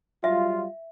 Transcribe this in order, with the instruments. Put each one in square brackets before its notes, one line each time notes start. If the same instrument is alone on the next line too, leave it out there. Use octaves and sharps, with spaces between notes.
[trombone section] F#3 G3 F4 [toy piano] E5